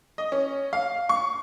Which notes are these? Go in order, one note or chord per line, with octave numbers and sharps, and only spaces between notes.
D#5
C#4
F5
C#6